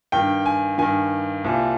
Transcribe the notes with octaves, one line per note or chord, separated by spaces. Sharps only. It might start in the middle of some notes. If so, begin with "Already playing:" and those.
G2 D#3 G5
G#5
G2 D#3 G#5
C2 A#2